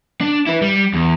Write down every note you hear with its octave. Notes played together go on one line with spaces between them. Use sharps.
D4
E4 B4
G3
E2